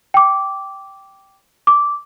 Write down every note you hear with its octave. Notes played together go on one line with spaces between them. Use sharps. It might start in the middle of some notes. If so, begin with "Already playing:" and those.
G5 D6
D6